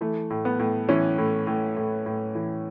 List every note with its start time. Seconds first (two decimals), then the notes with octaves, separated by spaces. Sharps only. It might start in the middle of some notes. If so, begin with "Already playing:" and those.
0.01 E3 A3
0.30 A2
0.45 B3
0.59 A2
0.89 E3 C#4
1.18 A2
1.47 A2
1.77 A2
2.06 A2
2.35 E3